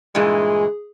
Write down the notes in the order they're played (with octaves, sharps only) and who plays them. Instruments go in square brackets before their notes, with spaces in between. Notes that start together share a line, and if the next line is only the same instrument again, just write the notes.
[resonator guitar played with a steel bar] G2 A#2 E3 [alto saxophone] G#3 [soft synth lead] G#4